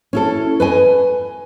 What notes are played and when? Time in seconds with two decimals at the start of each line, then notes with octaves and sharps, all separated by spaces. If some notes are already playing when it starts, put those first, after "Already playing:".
0.13 C#4 E4 A4
0.60 B4 D#5 G#5